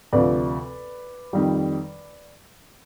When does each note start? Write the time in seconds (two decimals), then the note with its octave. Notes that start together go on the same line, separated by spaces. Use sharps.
0.13 D2 C3 F3 B4 D5
1.33 F2 D#3 G3